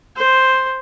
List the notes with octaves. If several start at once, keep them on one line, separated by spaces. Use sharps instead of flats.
C5